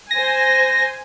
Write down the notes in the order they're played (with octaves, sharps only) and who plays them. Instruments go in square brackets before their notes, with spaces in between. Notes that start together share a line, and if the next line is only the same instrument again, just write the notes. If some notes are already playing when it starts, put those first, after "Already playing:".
[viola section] C5 G#5 [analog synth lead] A#6